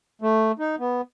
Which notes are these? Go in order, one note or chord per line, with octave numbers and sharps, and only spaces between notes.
A3
D#4
B3